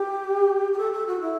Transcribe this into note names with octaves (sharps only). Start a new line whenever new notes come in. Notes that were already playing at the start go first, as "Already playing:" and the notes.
Already playing: G4
G4
A4
A4
F#4
E4